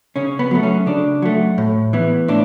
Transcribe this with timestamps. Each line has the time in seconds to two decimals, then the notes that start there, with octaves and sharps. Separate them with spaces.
0.16 C#3 C#4
0.39 B3
0.51 F#3 A3
0.63 C#4
0.86 C#3 D4
1.22 F#3 A3
1.58 A2
1.93 E3 B3
2.28 A2 D4